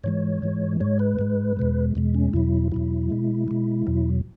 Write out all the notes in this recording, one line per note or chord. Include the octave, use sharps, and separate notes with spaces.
G#2 E3 G#3 C#5
G#2 E3 G#3
G#2 G#3 C#5
B4
G#2 G#3
E2 B2 G#3
E2 B2 G#3
C#4
E2 B2 F#3 E4
E2 B2 F#3 E4
B2 G#3
B2 G#3
E2 B2 F#3